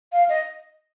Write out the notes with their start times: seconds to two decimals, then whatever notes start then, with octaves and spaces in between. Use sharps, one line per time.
0.13 F5
0.29 D#5